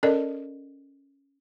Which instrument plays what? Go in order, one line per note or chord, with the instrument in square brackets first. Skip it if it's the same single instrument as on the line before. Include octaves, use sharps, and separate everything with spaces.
[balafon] C#4 A4 A#4 D5 D#5